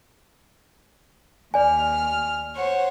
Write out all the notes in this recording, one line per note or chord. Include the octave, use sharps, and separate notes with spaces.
D#2 D5 G#5 F6
C5 C#5 F#5